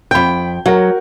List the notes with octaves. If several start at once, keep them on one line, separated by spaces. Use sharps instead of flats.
F2 G5 B5 G6
F#3 F#4 A#4